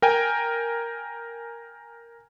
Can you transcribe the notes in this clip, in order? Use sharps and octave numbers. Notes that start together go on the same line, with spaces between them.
A#4 G5 G#5